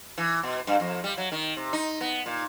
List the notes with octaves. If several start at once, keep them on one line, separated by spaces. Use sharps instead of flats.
E3
B2
G2
F2
G3
F#3
D#3
C3
D#4
B3
A#2